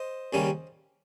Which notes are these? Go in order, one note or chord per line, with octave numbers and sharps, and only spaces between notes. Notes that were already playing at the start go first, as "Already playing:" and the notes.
Already playing: C5 D#5
D#2 C#3 G3 A#3 C#4